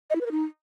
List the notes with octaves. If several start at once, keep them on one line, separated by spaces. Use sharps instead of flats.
D#5
E4
B4
A#4
D#4